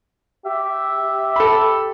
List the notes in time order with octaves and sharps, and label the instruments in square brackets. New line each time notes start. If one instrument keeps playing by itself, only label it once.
[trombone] G4 [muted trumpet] E5
[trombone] G4
[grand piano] A4 B5